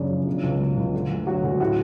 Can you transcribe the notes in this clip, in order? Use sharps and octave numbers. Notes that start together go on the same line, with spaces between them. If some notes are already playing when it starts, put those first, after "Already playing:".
Already playing: F#1 F#2 C#3 D4
F3
B2
C#2
F#3
C#2
D3
D2
F#3 F#4
D2
A2 F#4